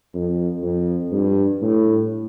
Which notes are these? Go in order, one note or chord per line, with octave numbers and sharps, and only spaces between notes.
F2
F2
G2
A2